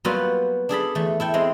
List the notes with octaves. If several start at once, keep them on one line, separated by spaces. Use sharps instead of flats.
F#3 G3 A#3 B3 F4 F#4
D4 G#4 A4 B5
E2 A3
E4 A4 G5
G#3 C4